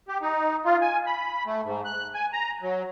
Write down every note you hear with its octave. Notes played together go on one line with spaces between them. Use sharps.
G4
D#4
F4
G#5
B5
A3
G#2
F#6
G#5
A#5
F#3